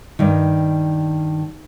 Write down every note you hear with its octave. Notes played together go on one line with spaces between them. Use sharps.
G2 D#3